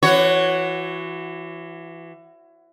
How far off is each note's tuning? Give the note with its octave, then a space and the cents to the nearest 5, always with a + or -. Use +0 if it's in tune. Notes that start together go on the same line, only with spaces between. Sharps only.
E3 +25 F#4 +0 C#5 +0